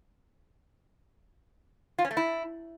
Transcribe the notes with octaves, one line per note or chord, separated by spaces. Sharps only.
F4
C#4
A3
E4